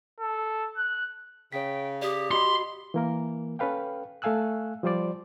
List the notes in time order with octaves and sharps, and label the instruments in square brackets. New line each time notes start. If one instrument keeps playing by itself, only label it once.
[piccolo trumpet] A4
F#6
[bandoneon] C#3 [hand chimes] C#5 B6 [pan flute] G5
[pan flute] G4 [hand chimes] D5 D#6
[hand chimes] F#4 D#5 B5 [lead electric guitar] C6
[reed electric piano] E3 A#3 A#4
C#4 A4 B4 F5 G5
A3 A4 F5 G#5 E6 F#6
F3 G3 F4 C5 D5